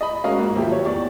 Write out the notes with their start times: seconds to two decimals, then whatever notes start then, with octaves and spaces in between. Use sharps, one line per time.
0.01 D#5 B5
0.24 G#3 C#4 F#4 A#4 D#5 F5
0.37 A#1 G#2 A#3
0.55 D#2 F3 F#3 G4 E5
0.71 G4 C#5
0.85 E2 D5 C#6